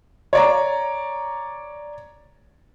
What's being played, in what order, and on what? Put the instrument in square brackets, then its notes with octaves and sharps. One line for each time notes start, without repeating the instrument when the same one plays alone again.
[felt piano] C#5 D5 A#5